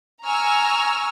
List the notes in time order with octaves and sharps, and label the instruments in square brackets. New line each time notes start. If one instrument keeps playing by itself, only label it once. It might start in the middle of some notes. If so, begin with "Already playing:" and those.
[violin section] G#5 A#5 C#6 E6 F6